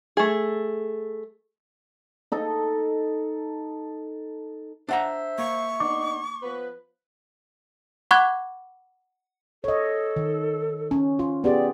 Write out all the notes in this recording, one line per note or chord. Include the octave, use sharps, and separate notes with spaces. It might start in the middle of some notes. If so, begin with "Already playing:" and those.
A3 G#4
D#4 A4 D#5
D4 C5 E5 F#5 A#5
A#3 C#6
B3 D4 D#4 D6
F3 B3 B4
F#5 B5 C#6 D6 F#6 G#6
A4 C#5 D#5
D#3
C#4
F4
B3 G4 G#4 D5